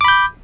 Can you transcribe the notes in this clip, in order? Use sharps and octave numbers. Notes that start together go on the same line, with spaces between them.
B5 D6 G6